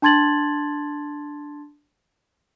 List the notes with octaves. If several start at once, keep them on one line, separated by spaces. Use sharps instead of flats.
D4 A5 C6 G#6 A6 F#7